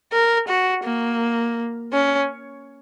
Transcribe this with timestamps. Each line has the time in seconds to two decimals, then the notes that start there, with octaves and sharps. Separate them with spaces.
0.13 A#4
0.48 F#4
0.85 A#3
1.93 C#4